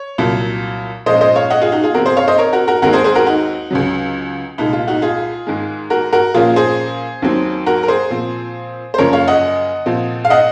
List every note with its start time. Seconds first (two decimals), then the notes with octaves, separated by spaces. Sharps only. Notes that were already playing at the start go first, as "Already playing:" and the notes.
Already playing: C#5
0.18 C2 A#2 F#3
1.06 A#2 F3 G#3 C#4 C5 D#5
1.21 C5 D#5
1.36 C#5 F5
1.50 D#5 F#5
1.61 F4 G#4
1.72 D#4 F#4
1.83 F4 G#4
1.94 C3 F3 C4 F#4 A#4
2.05 G#4 C5
2.17 C#5 F5
2.28 C5 D#5
2.38 A#4 C#5
2.53 F#4 A#4
2.68 F#4 A#4
2.82 D#2 D#3 G#3 C4 F#4 A#4
2.93 G#4 C5
3.04 G#4 C5
3.15 F#4 A#4
3.26 D#4 F#4
3.71 C#2 C#3 F#3
4.58 C2 A#2 G#3 D#4
4.73 F4
4.88 D#4 F#4
5.02 F4 G#4
5.47 G#2 D#3 G#3
5.90 F#4 A#4
6.13 F#4 A#4
6.34 A#2 F3 A#3 C#4 F4 G#4
6.56 G#4 C5
7.22 D#2 D#3 F#3 C4
7.66 F#4 A#4
7.83 A#4
7.88 G#4 C5
8.10 A#2 F3 C4
8.94 C5
8.98 F#2 C#3 F3 A#3 A#4 C#5
9.13 C#5 F5
9.28 D#5 F#5
9.86 A#2 F3 C4
10.25 F5
10.30 D#5 F#5